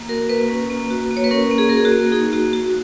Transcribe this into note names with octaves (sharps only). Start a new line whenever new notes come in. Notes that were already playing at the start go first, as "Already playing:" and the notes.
Already playing: A#3
F#4 A#4
A#3 B4
C#4
A#3
F#4
A#3
C#5
B4
C#4 A#4
A#3
G#4
F#4 A#4
G#4
F#4
A#3
D#4 G#4
A#3 F#4
F#4